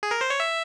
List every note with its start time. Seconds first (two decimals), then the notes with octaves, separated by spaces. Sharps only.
0.03 G#4
0.11 A#4
0.21 C5
0.30 C#5
0.40 E5